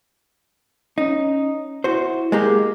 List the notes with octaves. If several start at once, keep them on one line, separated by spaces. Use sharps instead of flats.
C#4 D#4
E4 F#4 C5
G#3 A#3 G4 G#4